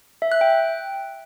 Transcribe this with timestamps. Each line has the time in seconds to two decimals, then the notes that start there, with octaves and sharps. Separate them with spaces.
0.22 E5
0.32 F#6
0.41 G5